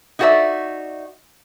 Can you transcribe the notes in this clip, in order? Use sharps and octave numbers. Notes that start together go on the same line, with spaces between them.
D#4 E4 F#4 A#4 D5 E5